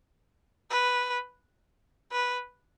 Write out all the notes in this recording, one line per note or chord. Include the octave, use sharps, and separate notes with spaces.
B4
B4